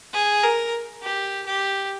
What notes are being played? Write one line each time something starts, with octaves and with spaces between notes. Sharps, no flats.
G#4
A#4
G4
G4